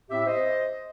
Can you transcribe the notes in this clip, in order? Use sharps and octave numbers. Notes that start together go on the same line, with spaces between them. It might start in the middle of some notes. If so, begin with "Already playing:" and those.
A2 C4 G4 E5
C5 D#5